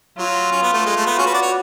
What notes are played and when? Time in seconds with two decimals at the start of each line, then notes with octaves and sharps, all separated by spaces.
0.18 F#3 F4
0.51 C#4
0.62 B3
0.73 A3
0.85 G#3
0.96 A3
1.06 B3
1.17 C#4 F#4
1.26 B4
1.34 D5
1.42 C#5